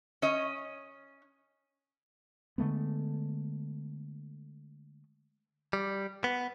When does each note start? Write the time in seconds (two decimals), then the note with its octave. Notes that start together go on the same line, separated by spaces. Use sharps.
0.22 C#4 D#5
2.58 D3 G#3 A3 B3
5.73 G3
6.24 B3